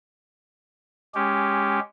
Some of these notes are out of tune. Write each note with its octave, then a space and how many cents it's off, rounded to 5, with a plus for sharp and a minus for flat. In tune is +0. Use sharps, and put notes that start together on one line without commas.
G#3 -5 C#4 +5 G4 +0